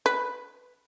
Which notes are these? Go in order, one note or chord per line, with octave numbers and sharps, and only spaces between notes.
B4